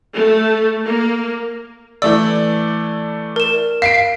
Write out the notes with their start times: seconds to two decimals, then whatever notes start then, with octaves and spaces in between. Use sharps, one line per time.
0.14 A3
0.84 A#3
2.02 E3 A3 D5 E6
3.36 A#4 E7
3.82 F5 B6 C7 D7